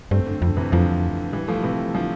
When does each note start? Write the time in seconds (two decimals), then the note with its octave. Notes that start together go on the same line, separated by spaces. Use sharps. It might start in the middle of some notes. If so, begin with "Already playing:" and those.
0.11 G2 A3 C4
0.27 D3
0.42 F2 D3
0.57 C3 E3
0.72 F2 D3 F3
1.32 E3 G3
1.48 F3 A3
1.63 C3 E3
1.95 D3 F3